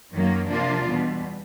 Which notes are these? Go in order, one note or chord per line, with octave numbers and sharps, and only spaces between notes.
F#2 D#3 F#3 A#3
C3 F3 A#3 D4 F4
E2 B2 G3